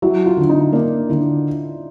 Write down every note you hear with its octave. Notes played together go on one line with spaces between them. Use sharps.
F#3 E4
F4
D3
D#4
A#3 D4
D3 E4